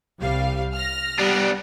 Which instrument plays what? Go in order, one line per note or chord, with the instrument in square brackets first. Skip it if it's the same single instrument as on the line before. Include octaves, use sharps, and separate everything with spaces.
[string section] C2 G3 F5
F6 A#6
[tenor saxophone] G3 [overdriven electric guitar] B3 D4